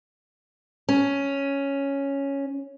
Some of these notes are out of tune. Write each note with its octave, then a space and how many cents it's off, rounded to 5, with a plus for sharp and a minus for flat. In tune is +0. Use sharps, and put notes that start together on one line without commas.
C#4 +0